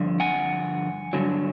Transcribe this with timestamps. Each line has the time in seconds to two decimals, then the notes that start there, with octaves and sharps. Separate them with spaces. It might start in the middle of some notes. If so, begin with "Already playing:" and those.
Already playing: G2 D3 F3
0.20 F#5 G#5
1.13 G2 D3 F#3